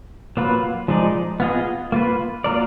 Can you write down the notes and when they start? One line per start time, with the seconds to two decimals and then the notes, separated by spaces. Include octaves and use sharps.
0.37 F#3 A#3 F4 B4
0.88 F3 G#3 D#4 G#4 D5
1.40 B3 F4 G#4 D#5
1.92 A#3 F4 B4
2.44 F#3 A#3 F4 A#4 D5